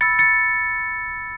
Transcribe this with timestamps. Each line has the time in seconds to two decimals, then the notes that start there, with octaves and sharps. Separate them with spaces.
0.01 B5 E6 A6 C#7
0.19 A6 C#7